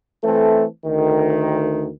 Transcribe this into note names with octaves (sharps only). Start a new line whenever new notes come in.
E3 A3 C4 A4
D2 D#3